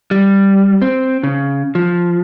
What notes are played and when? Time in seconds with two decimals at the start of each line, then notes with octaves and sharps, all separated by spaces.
0.11 G3
0.82 C4
1.23 C#3
1.75 F3